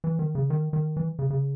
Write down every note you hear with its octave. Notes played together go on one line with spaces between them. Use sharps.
E3
D#3
C#3
D#3
D#3
E3
C#3
C#3